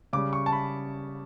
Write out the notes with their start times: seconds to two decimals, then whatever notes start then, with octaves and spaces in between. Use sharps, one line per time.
0.13 C#3 G3 D6
0.33 C#6
0.46 A5
0.52 B5